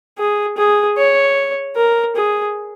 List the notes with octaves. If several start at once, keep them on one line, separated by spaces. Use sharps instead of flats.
G#4
G#4
C#5
A#4
G#4